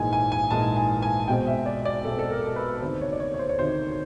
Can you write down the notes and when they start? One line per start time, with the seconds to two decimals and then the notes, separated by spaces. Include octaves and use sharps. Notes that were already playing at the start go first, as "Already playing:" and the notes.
Already playing: A#1 G#2 E3 G#3 G#5
0.13 G#5
0.32 G#5
0.51 A#1 G#2 E3 G#3 A5
0.76 G#5
1.02 G#5
1.28 B1 B2 G#3 C4 G5
1.47 E5
1.66 D5
1.85 D5
2.05 B1 B2 G#3 C4 A4
2.19 A4
2.30 A#4
2.56 B4
2.82 D2 C3 D#3 C5
3.01 C#5
3.13 D5
3.20 C#5
3.34 C#5
3.39 C5
3.49 C#5
3.58 D2 C3 D#3 C5